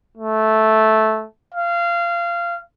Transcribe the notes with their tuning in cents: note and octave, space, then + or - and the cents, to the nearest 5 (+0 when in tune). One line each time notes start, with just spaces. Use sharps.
A3 -10
F5 -20